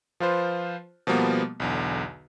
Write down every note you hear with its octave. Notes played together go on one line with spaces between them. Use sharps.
F3 F4 B4 C5
B2 F3 G3 A#3 B3
B1 E2 D3